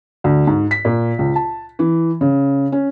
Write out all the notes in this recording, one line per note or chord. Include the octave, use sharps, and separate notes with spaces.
D2
G#2
B6
A#2
C#2
A5
E3
C#3
C#4